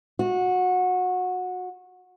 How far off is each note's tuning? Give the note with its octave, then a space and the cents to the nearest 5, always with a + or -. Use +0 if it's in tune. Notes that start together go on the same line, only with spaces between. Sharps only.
F#4 -20